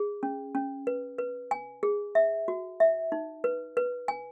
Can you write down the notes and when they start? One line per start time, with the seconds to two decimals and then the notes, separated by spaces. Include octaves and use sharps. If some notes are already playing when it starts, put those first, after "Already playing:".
Already playing: G#4
0.23 C#4
0.55 C#4
0.87 B4
1.19 B4
1.51 G#5
1.83 G#4
2.15 E5
2.48 F#4
2.80 E5
3.12 D#4
3.44 B4
3.77 B4
4.08 G#5